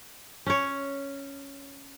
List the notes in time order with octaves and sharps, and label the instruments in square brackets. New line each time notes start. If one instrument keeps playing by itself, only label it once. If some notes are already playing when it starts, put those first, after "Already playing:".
[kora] C#4 C#5